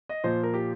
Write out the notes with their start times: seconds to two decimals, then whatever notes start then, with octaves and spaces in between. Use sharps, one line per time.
0.09 D#5
0.24 A#2 F3 A#3 C5
0.43 A#4
0.54 G4